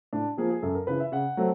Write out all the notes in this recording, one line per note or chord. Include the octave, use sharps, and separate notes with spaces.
A2 D4
F3 A#3 G#4
G#4
F#2 A4
A#4
C#3 E3 B4
E5
C#3 F#5
F#3 A3 C4